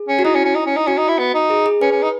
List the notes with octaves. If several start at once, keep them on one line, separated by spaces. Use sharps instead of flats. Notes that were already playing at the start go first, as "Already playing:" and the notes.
Already playing: G#4
C#4
F#4
D#4 E4
C#4
C#4
D#4
C#4
D#4
C#4 F#4
D#4
E4
B3
D#4
G#4
G#4
C#4 B4
C#4
D#4